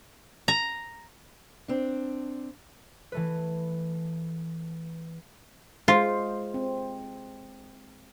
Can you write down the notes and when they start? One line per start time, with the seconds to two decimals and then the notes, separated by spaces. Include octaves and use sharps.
0.48 A#5
1.68 C4 D4
3.12 E3 A3 B4
5.88 G#3 F4 C5
6.54 C4